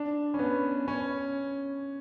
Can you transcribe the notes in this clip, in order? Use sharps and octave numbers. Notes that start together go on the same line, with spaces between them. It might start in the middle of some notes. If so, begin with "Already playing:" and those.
Already playing: D4
C#4
B3
C#4